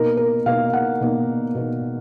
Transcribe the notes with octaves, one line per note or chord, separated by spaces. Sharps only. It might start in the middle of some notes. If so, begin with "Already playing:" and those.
Already playing: B2 A#3 D#4 A#4
A#4
B2 A#3 D#4 F5
F#5
B2 A#3 D#4
B2 A#3 D#4